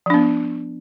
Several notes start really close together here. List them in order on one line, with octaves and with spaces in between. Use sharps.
F3 D4 B3